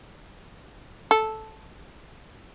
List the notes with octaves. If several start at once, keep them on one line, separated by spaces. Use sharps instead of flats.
A4